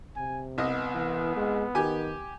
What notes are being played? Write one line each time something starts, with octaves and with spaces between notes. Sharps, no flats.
C3 G#5
C2 B3 D#5
E3
G#3
D#3 G4 G#5